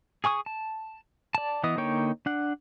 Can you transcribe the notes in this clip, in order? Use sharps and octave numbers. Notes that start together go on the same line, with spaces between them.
G#4 G#5 C#6 D#6
A5
D5 A5
E3 B3 D#5 D#6
D3 A#3 D#4 C#5 G5
D4 F#5